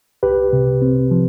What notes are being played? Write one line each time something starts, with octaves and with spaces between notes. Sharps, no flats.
C2 G4 B4
C3
C4
F3